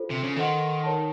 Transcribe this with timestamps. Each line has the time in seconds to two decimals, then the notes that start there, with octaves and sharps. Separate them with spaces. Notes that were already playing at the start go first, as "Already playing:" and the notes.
Already playing: F4 A4 C5
0.11 C3
0.24 C#3
0.36 D#3 A4 C5 D#5 F#5 C6
0.83 D#4 A#4 C#5 A5